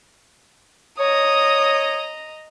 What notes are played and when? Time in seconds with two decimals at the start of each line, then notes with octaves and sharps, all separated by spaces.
0.99 C#5 D#5 A#5 D#6